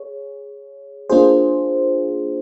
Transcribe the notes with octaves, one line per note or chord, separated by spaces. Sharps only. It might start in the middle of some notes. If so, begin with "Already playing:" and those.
Already playing: G#4 C#5
A#3 D4 F4 G#4 C5